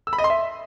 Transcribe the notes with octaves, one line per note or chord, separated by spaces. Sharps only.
E6
B5
D#5
C6
E5